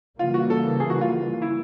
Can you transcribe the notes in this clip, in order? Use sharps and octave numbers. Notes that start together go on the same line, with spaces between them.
C#3 E3 G3 A#3 F4
F#4
A4
G#4
F#4
F4
E4